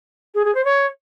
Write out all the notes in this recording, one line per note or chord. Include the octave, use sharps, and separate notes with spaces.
G#4
G#4
C5
C#5